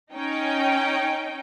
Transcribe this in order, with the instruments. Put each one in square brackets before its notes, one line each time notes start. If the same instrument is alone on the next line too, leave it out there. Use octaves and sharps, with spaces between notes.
[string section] C#4 D#4 G5